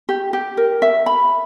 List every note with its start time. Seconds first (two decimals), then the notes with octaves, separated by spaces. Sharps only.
0.09 G4
0.33 G4
0.57 A#4
0.82 E5
1.06 B5